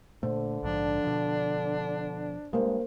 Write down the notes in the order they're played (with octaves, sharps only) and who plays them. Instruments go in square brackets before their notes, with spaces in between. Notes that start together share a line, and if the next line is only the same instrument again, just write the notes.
[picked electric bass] A#2 A3 [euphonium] D3 [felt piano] C5
[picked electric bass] A#1 G#2 F3 [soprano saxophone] D4
[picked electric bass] B2 F3
[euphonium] G2 [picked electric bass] G#3 [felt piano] A#3 C5